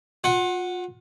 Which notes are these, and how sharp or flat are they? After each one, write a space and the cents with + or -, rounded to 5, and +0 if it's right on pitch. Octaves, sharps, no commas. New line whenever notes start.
F4 +35 F#5 +0